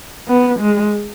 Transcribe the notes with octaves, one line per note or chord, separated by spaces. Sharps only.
B3
G#3